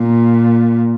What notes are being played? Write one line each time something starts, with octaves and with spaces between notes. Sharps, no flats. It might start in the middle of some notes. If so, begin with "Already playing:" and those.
Already playing: A#2